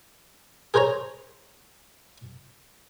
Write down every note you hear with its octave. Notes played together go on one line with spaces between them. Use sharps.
G#4 A#4 C5 C#5 A#5